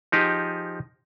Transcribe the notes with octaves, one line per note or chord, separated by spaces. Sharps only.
F3 D#4 G4 G#4